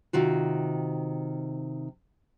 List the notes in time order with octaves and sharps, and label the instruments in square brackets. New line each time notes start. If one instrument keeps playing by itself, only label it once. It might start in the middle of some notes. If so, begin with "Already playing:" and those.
[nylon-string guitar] C3 D#3 F4 F#4